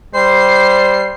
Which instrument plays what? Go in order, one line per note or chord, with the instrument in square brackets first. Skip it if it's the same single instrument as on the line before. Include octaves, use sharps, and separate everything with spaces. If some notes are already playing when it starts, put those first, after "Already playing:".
[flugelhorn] G3 [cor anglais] C5 [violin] C7